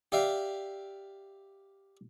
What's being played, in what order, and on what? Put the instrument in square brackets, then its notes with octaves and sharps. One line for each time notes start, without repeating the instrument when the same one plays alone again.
[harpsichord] G4 D5 E5 F5 G5